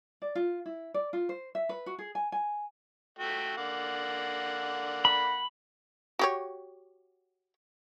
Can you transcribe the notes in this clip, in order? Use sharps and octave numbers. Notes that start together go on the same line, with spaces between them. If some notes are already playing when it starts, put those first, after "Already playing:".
D5
F4
E4
D5
F4
C5
E5
B4
F#4
G#4
G#5
G#5
A3 F#4 G5
D3 A#3 F#5
B5
F#4 G4 C#5